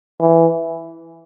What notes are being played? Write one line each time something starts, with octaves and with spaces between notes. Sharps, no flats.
E3